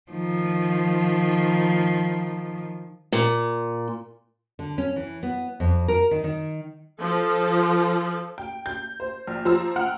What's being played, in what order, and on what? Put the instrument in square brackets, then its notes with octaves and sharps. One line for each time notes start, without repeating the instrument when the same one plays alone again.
[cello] D#3 F3
[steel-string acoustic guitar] A#2
[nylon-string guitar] D3
C#4
E3
B3
F2
A#4
D#3
D#3
[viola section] F3 A4
[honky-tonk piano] G5
G6
C5
A#1
F3 C5 A#5 E6
F#5 G5 F6